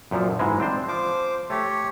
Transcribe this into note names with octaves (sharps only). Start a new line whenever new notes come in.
F#2 A#2 F3
G#2 E3 G#3
C4 D4 C5
F3 C5 D6
A3 G4 C#5